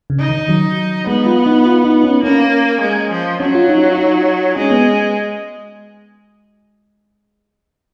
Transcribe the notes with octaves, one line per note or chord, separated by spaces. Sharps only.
C#3
D#4
D#3
F#3
G#3 B3
F4
D#4
F4
D#4
C#4
A#3 C#4
G#3
F3
F#3 C#4
F4
D#4
F4
D#4
G#3 C#4
B3